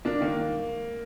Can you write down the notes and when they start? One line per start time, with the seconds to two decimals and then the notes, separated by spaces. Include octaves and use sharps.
0.05 A#3 D4
0.21 D#3 A#3